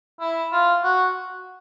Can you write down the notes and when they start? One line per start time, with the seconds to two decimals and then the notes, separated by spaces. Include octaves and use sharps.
0.21 E4
0.52 F4
0.84 F#4